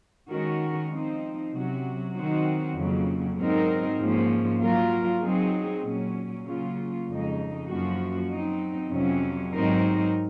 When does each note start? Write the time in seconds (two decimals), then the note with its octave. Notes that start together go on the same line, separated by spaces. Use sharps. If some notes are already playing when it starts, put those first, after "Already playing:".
0.29 D#3 G#3 C#4 F#4 A#4
0.90 F3 C4 D#4
1.52 C3 F#3 C#4 F#4
2.14 D#3 F#3 C4 D#4 F#4
2.75 F2 C#3 F#3 A#3
3.37 G#2 F#3 C4 D#4 A#4
3.98 G#2 F3 A#3 C#4
4.60 F#3 A#3 F4 A#4
5.21 F#3 C4 D#4 G#4
5.83 A#2 F#3 C#4
6.45 C#3 F#3 A#3 C#4 F4
7.06 F2 C#3 G#3 D#4
7.68 F#2 F3 A#3 C#4 F#4
8.30 F#3 C4 D#4
8.91 F2 C3 F#3 C#4
9.53 G#2 F#3 C4 D#4 A#4